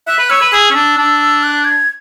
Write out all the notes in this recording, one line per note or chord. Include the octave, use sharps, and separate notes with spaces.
E5 F#6
B4
C#5 E6
B4
G#4 E6
C#4
D4
D4
F#6
G#6